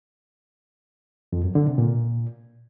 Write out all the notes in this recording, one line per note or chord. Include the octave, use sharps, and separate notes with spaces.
F2
F#2
D3
C3
A#2